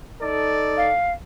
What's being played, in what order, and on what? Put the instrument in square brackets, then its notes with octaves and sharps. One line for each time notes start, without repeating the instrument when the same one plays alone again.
[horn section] D#4 A4 D5
[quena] F5